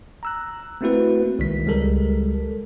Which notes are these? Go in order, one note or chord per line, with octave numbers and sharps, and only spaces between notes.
A#5 E6 F#6
A3 A#3 C4 E4 F#4 B4
C2 D#3 G#3 B6
C#2 G3 G#3 A4 A#4